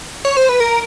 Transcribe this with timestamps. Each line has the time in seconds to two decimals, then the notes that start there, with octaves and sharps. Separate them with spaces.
0.25 C#5
0.37 C5
0.49 B4
0.60 A#4